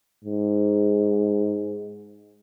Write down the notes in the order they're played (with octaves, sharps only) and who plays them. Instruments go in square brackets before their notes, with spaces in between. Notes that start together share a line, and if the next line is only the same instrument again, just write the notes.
[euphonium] G#2